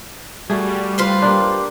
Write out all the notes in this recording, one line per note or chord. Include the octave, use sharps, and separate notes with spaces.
G3 A3 F#4 G#4
F4 B4 C5
A#3 D4 G4